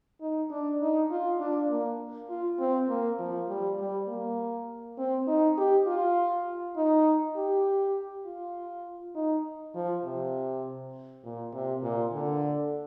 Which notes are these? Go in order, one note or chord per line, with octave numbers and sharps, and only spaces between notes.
D#4
D4
D#4
F4
D4
A#3
F4
C4
A#3
F3
G3
G3
A#3
C4
D#4
G4
F4
D#4
G4
F4
D#4
F3
C3
A#2
C3
A#2
D3